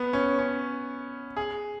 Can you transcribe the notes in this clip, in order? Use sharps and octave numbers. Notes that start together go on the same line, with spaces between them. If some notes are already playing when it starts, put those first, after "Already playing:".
Already playing: B3
C#4
C#4
G#4